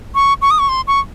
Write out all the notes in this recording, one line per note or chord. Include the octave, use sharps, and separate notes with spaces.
C#6
C#6
D#6
C#6
C6
C#6